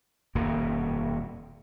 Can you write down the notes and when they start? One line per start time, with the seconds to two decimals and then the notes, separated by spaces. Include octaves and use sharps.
0.35 D#1 F2 B2 A#3